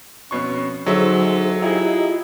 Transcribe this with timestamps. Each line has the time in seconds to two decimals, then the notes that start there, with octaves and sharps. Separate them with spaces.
0.31 F2 B2 C#4 C#6
0.86 D2 F#3 D#4 G#4 A4 C5 E5 C#6
1.62 E4 F4 G4 G#4 D#5 A#5